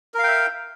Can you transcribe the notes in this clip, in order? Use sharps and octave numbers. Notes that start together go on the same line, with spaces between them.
A#4 E5 F5 G5